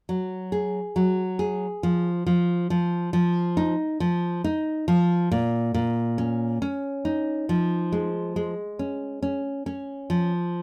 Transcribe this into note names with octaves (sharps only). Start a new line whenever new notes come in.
F#3
G#4
F#3
G#4
F3
F3
F3
F3
D#4
F3
D#4
F3
A#2
A#2
C#4
C#4
D#4
F3
G#3
G#3
C#4
C#4
C#4
F3